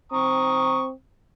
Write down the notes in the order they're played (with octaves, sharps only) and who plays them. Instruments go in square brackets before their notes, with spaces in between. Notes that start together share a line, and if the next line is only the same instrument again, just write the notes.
[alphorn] C4 [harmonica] A#5 C#6 D#6